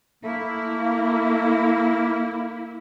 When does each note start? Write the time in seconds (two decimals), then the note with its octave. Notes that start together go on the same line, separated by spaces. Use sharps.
0.24 A3 A#3 E4